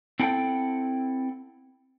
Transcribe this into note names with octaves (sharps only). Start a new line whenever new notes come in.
C4 E4 A4 F#5 G5